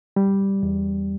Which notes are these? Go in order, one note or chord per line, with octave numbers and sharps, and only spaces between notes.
G3
E2